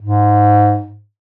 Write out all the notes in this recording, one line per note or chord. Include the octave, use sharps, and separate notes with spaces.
G#2